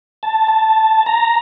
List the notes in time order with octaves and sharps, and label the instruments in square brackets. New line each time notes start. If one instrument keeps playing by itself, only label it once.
[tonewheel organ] A5
A5
A#5